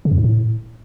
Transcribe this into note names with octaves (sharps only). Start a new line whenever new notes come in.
C#3
F2
G#2
A2